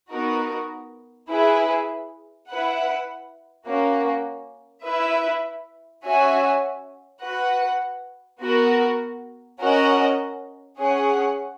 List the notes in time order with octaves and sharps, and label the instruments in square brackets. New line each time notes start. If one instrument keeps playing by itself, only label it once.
[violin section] B3 D#4 F#4 A#4
E4 G#4 B4
E4 B4 F#5
A#3 C#4 F#4
E4 B4 E5
C#4 F#4 C#5 E5 G#5
F#4 B4 F#5
B3 F#4 A#4
C#4 F#4 A#4 D#5 F#5
C#4 G#4 C#5 F#5